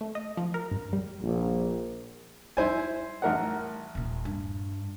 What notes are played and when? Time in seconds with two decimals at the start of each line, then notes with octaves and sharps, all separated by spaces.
0.01 A3
0.15 D#5
0.37 F3
0.54 A#4
0.71 G2
0.93 G3
1.22 A#1
2.57 G3 E4 C5 G#5
3.22 A1 A#4 F#5
3.95 D#1 A#2
4.25 G2